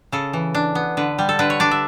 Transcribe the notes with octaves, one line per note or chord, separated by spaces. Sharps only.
C#3 A4
E3
D4
B3
D3 B4
G3
A4
D3 B4
C#5
D4 D5
E5